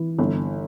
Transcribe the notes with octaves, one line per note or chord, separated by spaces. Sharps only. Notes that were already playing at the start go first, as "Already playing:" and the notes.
Already playing: E3
G1